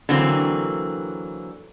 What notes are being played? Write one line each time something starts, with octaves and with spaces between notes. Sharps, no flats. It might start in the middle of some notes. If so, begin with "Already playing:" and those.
D3 E3 F#3 A#3 C4